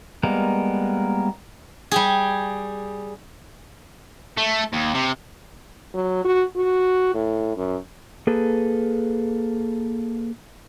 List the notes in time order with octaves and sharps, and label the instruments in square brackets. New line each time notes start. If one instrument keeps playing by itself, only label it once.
[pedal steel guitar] G3 G#3 A#3 B3 A#4
[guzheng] G3 G4 G#4
[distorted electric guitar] A3
D#2
C3
[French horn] F#3
F#4
F#4
A2
F#2
[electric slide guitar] A#3 G#4 A4 B4